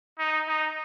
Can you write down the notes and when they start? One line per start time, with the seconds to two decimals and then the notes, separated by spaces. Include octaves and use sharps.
0.19 D#4
0.48 D#4